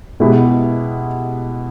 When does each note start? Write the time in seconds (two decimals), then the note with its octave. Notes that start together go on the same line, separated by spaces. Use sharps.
0.20 B2 G#3 B3 E4 G4